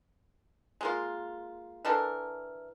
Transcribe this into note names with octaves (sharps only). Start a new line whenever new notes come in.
G#3 A#3 F4
E3 D4 A4 A#4